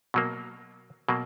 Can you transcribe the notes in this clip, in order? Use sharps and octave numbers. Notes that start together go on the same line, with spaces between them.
B2 F#3 A#3
B2 F#3 A#3